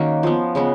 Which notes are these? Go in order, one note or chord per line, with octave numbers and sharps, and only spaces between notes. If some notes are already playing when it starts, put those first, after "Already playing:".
Already playing: D#3 A#3 C#4 F#4 F#5
F3 B3
C#3 G#3 B3